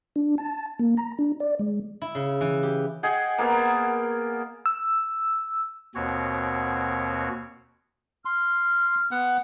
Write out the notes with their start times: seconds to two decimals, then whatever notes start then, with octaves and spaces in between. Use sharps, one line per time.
0.16 D4
0.38 A5
0.79 A#3
0.97 A#5
1.19 D4
1.40 D5
1.59 G#3
2.02 E4
2.15 C#3
2.41 E3
2.63 G4
3.03 G#4 D#5 F#5 G5
3.38 A#3 B3 A#4
4.66 E6
5.95 D#2 B2 C4 F#4 C#5
8.25 C6 F6
9.11 B3 F#5